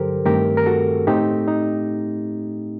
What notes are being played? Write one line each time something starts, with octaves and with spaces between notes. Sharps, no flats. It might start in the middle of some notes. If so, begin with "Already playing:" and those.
Already playing: G2 D3 F#3 G4 A4 A#4 C5
G2 D#3 A3 C4 G4 A#4
A#4
F#4 A4
A2 A3 C4 D#4 G4
D#4